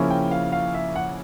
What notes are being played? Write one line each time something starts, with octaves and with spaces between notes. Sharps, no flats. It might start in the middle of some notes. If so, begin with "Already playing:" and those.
Already playing: C#3 F3 A#3 C#4 E4
G5
F5
F5
E5
F#5